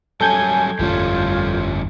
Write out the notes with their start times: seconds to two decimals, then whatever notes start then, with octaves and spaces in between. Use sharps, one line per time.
0.21 F#3 G3 C#4 A4 G#5 G6 G#6
0.79 G1 F2 E3 G3 A3 C#4 F4